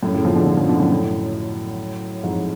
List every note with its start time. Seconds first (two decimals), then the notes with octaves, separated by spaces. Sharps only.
0.03 F#2 A2
0.13 A2 C#3
0.25 C#3 F3
0.35 B2 D3
0.47 C#3 F3
0.57 C#3 F3
0.69 B2 D3
0.80 F#2 A2
0.91 F#2 A2
2.24 F2 G#2